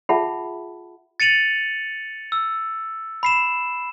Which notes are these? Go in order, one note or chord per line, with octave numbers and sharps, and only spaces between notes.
F4 G#4 E5 F#5 A5 B5
A6 C#7 D#7 F7 F#7
E6
B5 C7 E7